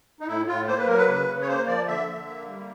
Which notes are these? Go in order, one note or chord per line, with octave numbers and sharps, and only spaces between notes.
D#4
A2 E4
A2 F4
A#3 C5
B4
F#3 A#4
B4
C#3
C#3
C#5
A#3 C5
F3 D5
D3 E5
D3
A#3
G3